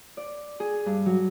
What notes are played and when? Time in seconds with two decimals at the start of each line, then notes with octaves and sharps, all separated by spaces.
0.17 D5
0.60 G#4
0.86 G2
1.06 F#3